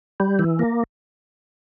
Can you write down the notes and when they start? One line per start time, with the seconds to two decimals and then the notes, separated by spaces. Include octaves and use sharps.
0.20 G3
0.39 E3
0.59 A#3